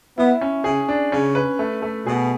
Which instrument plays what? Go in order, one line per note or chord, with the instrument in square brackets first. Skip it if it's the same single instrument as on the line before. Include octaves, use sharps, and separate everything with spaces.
[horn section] B3 [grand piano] E4
[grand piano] C#4
[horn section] C#3 [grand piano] G#4
[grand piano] D4
[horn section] C#3 [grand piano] C#4
[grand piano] B4
A3
A3
[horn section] B2 [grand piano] G#4